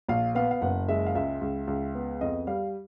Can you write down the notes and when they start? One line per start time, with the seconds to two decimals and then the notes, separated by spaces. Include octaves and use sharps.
0.08 A#1 F5
0.35 B3 F5
0.51 F5
0.61 F#1 F#5
0.88 G#3 E5
1.07 F5
1.15 C#2 E5
1.41 C#2
1.67 C#2
1.95 B3
2.21 F2 D#5
2.47 G3 F5